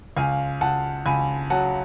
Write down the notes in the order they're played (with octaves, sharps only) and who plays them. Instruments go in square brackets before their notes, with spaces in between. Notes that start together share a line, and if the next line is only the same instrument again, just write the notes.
[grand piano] C#2 F5 G#5
C#2 F#5 A5
C#2 G#5 B5
F#3 F#5 A5